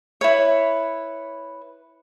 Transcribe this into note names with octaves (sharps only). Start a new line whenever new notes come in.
E4 B4 C#5